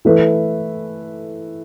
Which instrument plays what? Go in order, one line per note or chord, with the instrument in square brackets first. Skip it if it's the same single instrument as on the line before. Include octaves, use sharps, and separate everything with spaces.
[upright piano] E3 A3 E4 B4